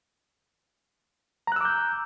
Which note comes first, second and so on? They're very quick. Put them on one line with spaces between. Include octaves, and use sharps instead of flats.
A#5 F#6 E6 D6 G6